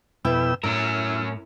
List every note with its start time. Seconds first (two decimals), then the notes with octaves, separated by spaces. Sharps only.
0.25 F2 B2 E4 B4 G5 E6
0.63 A2 C#4 E4 A#4